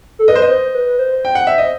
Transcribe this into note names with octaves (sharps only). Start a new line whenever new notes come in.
A4
B4 D#5
C5
D#5
C5
B4
C5
G5
F#5
E5
D#5